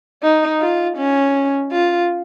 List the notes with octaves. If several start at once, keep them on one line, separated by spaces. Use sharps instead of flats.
D#4
F4
C#4
F4